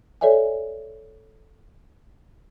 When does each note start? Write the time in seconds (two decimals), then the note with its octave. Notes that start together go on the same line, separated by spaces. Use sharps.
0.21 A4 C#5 D5 E5 G#5